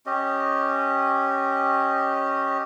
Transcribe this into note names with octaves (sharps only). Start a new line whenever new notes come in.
C#4 G4 D#5